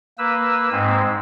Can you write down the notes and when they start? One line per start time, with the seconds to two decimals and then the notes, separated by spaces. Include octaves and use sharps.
0.18 A#3 B4 E6
0.72 G#2 G#3 C4